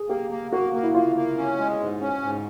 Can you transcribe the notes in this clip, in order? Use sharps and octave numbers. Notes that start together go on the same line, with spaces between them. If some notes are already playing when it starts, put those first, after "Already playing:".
Already playing: G#4
A#3 G4
A#3
A#3 F#4
A#3
E4
A#3 F4
A#3
C#4
G#3
G#2
C#4
G#2